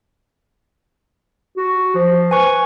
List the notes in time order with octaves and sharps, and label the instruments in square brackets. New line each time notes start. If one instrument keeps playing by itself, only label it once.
[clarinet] F#4
F3
[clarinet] B4 [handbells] G#5 C#6